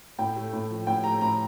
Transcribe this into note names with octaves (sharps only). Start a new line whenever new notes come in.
A2 G5
A3
A2
F3
A2 G5
A3 A#5
A2 A#5